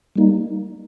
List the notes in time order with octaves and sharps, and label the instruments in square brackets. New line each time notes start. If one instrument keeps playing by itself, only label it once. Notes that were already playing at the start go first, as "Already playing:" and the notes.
[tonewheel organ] G3 A#3 D#4